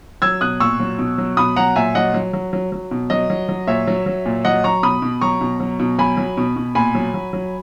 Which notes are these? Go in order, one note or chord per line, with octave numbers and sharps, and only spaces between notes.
F#3 E6 G#6
B2 D#6 F#6
A#2 C#6 E6
F#3
B2
F#3
B2 B5 D#6
F#3 F#5 A#5
A#2 E5 G#5
F#3 D#5 F#5
F#3
F#3
F#3
F#3
B2
F#3 D#5
F#3
F#3
A#2 C#5 E5
F#3
F#3
A#2
F#3 D#5 F#5
F#3 A#5 C#6
B2 B5 D#6
B2
F#3 A#5 C#6
B2
F#3
B2
F#3 G#5 B5
F#3
B2
B2
A#2 G#5 B5
F#3
F#3
F#3